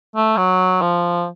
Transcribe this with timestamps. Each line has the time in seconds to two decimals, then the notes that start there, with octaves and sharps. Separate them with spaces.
0.16 A3
0.37 F#3
0.82 F3